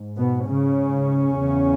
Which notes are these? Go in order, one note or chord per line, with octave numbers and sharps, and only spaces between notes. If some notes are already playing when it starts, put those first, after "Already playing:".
Already playing: G#2
B2 B3
C#3 C#4
E2 C#3